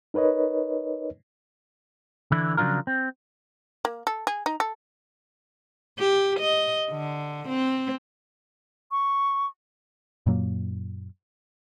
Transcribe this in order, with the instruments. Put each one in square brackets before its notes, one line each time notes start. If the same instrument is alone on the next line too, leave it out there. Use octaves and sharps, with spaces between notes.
[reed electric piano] D#4 A#4 B4 C#5 D#5
[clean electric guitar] D3 E3 E4
C#3 F3 F#3 D4 F4 A#4
C4
[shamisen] A#3
A4
G#4
D#4
A4
[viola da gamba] G4
D#5
D3
C4
[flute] C#6
[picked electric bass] F#2 A#2 F#3 A#3